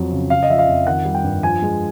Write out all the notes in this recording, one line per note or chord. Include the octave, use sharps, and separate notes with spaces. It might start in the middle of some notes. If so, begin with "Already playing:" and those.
Already playing: F2 F#3
C#3
C#3 F5
D#5
F3 E5
F5
F2
D#3 F#5
G3
G5
G2
F3 G#5
G#3